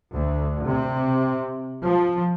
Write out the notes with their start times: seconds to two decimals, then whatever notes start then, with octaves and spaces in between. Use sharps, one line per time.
0.15 D2
0.67 C3
1.82 F3